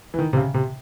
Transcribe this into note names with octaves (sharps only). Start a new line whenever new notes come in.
E3
D#3
C3
C#3
C3